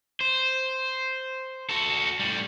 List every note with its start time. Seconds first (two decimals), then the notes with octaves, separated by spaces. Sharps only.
0.21 C5
1.69 F#4 A4
2.19 A2 G3